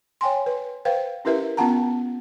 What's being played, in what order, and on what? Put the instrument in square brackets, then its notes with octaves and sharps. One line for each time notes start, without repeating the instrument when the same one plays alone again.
[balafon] C#5 G5 G#5 C6
B4
B4 C5 F5 G5
C#4 E4 G4 A#4 B4 E5
B3 C#4 F4 F#5 A5 A#5